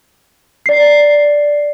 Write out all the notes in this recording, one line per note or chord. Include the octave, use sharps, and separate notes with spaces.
D5 C7